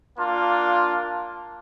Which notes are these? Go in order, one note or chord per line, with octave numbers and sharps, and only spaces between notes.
A#3 D4 F4